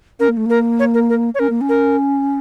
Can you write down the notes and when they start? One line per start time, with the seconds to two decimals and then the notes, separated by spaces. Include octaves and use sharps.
0.20 C#4 A#4
0.29 A#3
0.37 A3
0.46 A#3 A#4
0.80 C#5
0.94 A#4
1.10 A#4
1.35 C#5
1.39 C#4 A#4
1.50 A#3
1.61 C#4
1.69 A#4